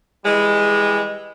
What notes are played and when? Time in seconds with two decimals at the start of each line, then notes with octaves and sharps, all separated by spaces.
0.25 E3 G3 G#3